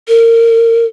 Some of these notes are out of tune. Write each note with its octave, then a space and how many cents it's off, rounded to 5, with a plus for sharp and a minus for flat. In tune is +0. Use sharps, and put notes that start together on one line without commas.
A#4 -25